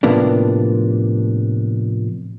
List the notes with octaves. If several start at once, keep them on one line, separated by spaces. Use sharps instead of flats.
A2 C3 F3 A#3 B3 D4